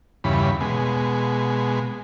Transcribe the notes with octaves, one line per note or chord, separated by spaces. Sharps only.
E2 G2 C#3 B5
B2 G#3